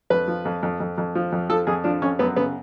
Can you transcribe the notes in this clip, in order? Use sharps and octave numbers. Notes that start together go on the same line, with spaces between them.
F2 B4
F3
F2
F2
F2
F2
F3
F2
F3 A4
F2 G#4
F3 D4
F2 C#4
F#2 B3
C#3 B3